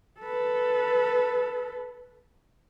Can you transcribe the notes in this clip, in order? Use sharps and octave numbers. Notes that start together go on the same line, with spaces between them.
A4 B4